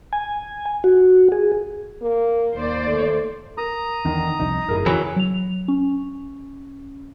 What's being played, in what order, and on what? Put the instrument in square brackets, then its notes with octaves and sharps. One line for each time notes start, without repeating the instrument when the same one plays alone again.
[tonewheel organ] G#5
F#4
G#4
[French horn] A#3
[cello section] D#2 C5 D5
[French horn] A3
[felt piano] A#4 [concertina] A#5 D#6
[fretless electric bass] E2 [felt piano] D3 D#3
[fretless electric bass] F1 C2 F2 [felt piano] D#4
[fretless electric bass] G1 F#2 A2 [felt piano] E4 G#4 A#4
[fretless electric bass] F2 C#3 [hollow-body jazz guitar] E3 F#3
[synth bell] F#3 F7
C#4